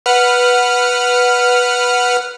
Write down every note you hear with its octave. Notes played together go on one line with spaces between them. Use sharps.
B4 F#5 F6